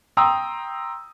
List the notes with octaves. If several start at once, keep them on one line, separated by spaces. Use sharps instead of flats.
G5 A#5 C6 D#6 E6